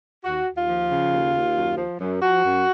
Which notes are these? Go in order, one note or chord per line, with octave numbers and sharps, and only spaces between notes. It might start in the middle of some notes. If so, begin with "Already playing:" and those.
D#2 F#4
D#2
F4
F3
C#3
D#2
D#2
F#2
F3
F#2
F3 F#4
F#2